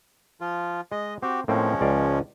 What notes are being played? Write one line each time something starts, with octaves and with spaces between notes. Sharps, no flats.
F3 F4
G#3 D#5
C4 F#4 G4
A2 F3 G#3 A#3 C4 C#4
C#2 D5 F5